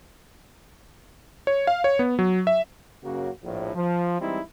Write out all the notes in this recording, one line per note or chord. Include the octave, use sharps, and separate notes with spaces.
C#5
F5
C#5
B3
F#3
E5
F#2 C#3 F#3 A#3 F#4
A#1 A2
F3
E3 G3 G#3 C4 D#4 E4